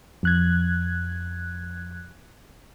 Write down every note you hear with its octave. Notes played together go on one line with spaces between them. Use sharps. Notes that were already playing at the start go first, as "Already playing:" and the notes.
F2 F#6 G#6